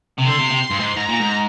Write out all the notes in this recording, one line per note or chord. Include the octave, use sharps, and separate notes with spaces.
C3
D3 C6
C3
C3
G2
G#2
G#2 A#5
A#2
G#2